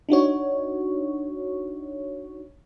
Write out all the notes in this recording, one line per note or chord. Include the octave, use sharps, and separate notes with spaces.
D4 D#4 F#4 C#5